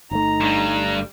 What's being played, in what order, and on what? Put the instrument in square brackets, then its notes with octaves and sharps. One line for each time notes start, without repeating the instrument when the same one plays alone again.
[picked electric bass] G1 A3 [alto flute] D#4 [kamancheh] A#5
[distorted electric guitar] G2 G3